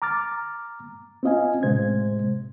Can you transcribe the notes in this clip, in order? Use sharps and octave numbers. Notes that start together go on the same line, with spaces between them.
A#5 D6 F6 A6
C4 C#4 F4 D#5 F5 G#5
A2 C3 G#3 C5 G#6